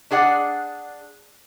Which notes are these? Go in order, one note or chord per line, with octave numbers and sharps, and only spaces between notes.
D4 G#4 D5 F#5